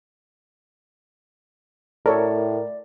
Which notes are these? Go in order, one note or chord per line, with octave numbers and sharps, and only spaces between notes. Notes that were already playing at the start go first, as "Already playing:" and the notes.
A2 A4 A#4 C#5 D5